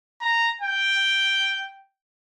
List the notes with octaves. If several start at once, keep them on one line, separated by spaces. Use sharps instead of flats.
A#5
G5